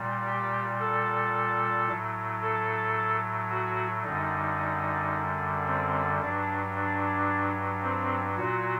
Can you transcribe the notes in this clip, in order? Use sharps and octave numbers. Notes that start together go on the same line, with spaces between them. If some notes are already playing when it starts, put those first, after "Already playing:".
Already playing: A#2 G3
G4
A4
A2 F#3
A4
F#4
F#2 D3 G3 D#4
C4
G2 F#3 D4
D4
C4
A#2 F#3 F#4